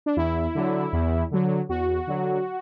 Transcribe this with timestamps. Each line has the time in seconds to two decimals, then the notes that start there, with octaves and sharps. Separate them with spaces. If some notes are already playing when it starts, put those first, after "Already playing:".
0.06 D4
0.17 E2 E4
0.55 D3 F#3
0.93 E2
1.31 D3 F#3
1.69 E2 F#4
2.07 D3 F#3